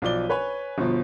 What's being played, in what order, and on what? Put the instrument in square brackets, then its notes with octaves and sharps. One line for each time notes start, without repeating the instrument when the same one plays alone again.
[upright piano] B1 F3 D5 G7
B4 C#5 G#5 B5
G1 B2 F3